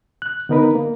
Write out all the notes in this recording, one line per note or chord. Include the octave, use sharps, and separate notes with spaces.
F#6
D3 B3 D#4 A#4 B4
A#3